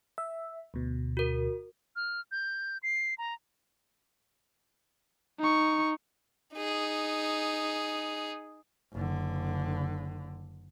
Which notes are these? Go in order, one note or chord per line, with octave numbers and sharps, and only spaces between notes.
E5
D2 B2
F#4 A#4
F6
G6
C7
A#5
D#4 C#6
D#4 G#4
F#1 D3